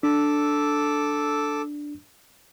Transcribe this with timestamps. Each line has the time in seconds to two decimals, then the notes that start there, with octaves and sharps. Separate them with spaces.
0.03 D4 A4 D6 E6